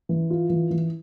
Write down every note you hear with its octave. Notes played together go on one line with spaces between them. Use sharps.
E3
F4
E3
E3